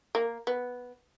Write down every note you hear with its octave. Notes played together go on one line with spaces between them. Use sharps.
A#3
B3